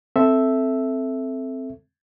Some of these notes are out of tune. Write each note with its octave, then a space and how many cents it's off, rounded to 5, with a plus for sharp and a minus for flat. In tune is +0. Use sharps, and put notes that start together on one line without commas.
C4 +0 A4 +0 E5 +0